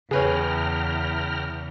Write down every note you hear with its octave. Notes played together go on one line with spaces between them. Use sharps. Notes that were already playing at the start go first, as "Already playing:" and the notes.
E2 C#3 G#4 B4 C#5 G5 A#5 F6